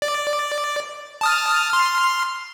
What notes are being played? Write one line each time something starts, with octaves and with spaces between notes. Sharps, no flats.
D5
A5 D#6 F6
C6 F6